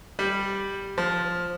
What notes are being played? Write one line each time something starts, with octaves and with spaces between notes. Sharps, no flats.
G3
F3